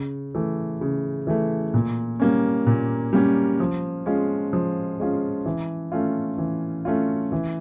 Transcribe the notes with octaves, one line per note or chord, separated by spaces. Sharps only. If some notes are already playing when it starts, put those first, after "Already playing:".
Already playing: C#3
E3 A3
C#3
E3 A3
A#2
G3 A#3 C#4
A#2
G3 A#3 C#4
F3
G#3 C#4 F4
F3
G#3 C#4 F4
E3
A3 C#4 F4
E3
A3 C#4 F4
E3